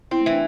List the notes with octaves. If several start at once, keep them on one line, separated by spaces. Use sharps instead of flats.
C4 E4
A3
E3
D4